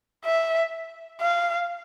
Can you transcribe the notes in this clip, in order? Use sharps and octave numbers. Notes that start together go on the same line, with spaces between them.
E5
F5